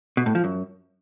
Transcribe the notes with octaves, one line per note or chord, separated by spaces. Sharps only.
B2
A2
F3
F#2